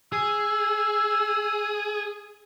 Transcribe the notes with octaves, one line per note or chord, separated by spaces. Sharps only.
G#4 E6